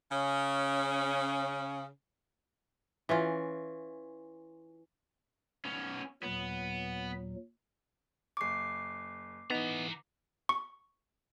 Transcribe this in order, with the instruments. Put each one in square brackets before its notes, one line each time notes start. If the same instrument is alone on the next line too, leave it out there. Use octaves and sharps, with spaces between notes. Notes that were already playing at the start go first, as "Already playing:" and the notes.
[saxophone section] C#3 C#4
[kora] E3 C#4 F4
[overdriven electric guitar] B3 C#4
[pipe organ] D#2 A#2 F#3 [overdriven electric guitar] B3
[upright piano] F#1 C#6 [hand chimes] D6 C7
[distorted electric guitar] E3 A#5 [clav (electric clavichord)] B3 [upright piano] D#4
[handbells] C#6